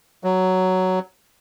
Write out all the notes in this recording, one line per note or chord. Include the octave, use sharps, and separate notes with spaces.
F#3